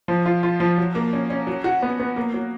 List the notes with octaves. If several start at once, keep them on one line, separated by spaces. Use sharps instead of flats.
F3
F4
F4
F3
F#3
A#3
C#4
C#4
F#3
F#4
B3
B3
A#3
F#3